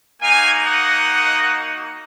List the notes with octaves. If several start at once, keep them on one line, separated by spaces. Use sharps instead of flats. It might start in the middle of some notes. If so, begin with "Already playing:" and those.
A#3 D#4 F#4 F5 G#5
D#5 F#5